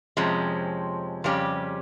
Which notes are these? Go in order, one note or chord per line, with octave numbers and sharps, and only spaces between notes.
F2 C3 F3 G#3 C#4
F2 C#3 G3 C#4 G4